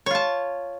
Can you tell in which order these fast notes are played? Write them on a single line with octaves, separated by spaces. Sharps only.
C#5 F4 A5